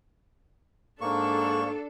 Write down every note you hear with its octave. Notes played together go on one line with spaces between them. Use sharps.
G#2 A#3 D4 A4 C#6